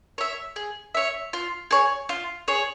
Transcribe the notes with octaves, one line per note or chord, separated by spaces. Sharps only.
C#5 E5
G#4
C#5 E5
F4
G#4 C#5
F4
G#4 C#5